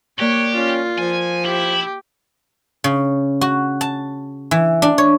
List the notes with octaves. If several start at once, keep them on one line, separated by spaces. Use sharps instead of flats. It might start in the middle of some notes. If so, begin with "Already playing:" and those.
A#3 G4 C#5 D5 F#6
C#4 F4
F3 G#5
E4 G4
C#3
F#4
A5
E3
D4
C#5